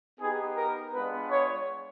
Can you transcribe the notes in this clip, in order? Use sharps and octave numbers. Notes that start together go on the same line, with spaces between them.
B3 D#4 G4 G#4
A#4
G#3 B3 D4 F4 B4
C#5